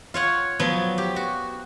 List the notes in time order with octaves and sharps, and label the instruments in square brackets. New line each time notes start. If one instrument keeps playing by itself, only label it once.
[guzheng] F4 C#5 F#5
F3 F#3 B3
G4
F#4